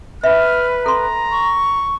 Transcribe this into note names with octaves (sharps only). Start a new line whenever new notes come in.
B4 E5 F6
A4 A#5 C6
C#6